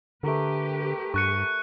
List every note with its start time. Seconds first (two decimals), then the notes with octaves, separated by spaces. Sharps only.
0.23 D3 A3 G4 A#4 B4
1.14 G2 C#6 F#6 C#7